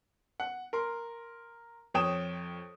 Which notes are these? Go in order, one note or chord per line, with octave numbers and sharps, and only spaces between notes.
F#5
A#4 C6
F2 C#5 G5 D#6 E7